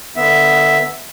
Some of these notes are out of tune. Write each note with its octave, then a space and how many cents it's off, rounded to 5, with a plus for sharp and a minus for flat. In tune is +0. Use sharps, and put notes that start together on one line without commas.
D3 +25 B3 +0 E5 +0